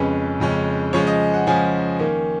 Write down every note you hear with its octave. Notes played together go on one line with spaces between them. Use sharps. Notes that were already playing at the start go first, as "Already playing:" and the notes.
Already playing: F2 C#3 G#3 C#4 B4
F2 C#3 G#3 C#4
C#3 F3 G#3 C#4 C#5
D#5
F#5
C#3 F3 G#3 C#4 G#5
D#3 A#3 C#4